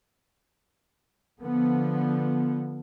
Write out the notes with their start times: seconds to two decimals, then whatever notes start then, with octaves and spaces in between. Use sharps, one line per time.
1.41 D3 F3 B3